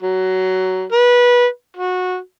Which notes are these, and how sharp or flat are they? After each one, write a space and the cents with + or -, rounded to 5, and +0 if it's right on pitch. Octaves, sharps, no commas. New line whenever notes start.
F#3 +15
B4 -20
F#4 -20